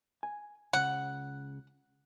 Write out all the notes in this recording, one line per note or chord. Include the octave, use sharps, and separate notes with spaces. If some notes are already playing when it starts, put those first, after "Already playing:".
G#5
C#2 C#3 F#5